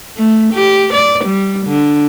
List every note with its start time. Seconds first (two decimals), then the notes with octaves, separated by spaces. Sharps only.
0.17 A3
0.53 G4
0.94 D5
1.25 G3
1.66 D3